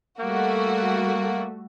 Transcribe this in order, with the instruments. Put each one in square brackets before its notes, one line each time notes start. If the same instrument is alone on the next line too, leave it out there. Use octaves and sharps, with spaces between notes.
[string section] G3 A3 F#4 [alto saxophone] A#3